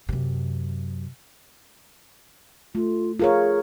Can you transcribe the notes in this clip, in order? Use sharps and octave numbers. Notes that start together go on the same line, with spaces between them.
F#2 C3
A3 F4
F4 G#4 A#4 C#5